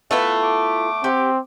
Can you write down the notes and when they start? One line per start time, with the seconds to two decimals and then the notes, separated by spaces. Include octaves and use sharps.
0.11 A3 B3 E4 F4 A4 F#5
0.43 D6
1.04 C4 G4 F#5